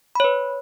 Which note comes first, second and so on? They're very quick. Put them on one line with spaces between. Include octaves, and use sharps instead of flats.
B5 C#5 B4